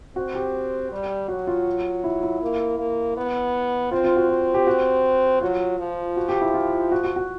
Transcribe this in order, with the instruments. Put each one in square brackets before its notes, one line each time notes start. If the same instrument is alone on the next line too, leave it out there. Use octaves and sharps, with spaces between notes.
[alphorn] C4 [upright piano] F#4
[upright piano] G4
[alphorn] G3
[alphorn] F#3 [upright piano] F#4
[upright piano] F4
E4
E4
[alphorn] A#3
A#3
B3
[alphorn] C4 [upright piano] F4
[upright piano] F4
F#4
F4
G4
F#4
[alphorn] F#3 [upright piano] F4
[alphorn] F3
[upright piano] F#4
G4
E4
F4
F#4
F#4
F#4